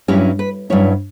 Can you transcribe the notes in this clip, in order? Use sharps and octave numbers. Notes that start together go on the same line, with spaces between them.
G2 F#3 C#4 E4 G4
B4
G2 F#3 C#4 E4 C#5